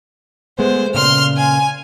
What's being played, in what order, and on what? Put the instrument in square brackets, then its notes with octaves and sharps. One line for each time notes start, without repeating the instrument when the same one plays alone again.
[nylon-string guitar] G#3 A3 B3 [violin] C5
[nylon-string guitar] A#2 C#3 [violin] C6 F6
[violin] G#5